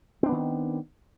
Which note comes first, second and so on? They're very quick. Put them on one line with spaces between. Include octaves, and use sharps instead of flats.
C4 D4 B3 D#3